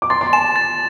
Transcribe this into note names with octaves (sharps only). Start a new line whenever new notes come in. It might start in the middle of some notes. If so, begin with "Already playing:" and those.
D6
C6 A6
C6
A5 E7
A6